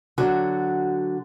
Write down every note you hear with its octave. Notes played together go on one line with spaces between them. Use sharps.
D3 F#3 F#4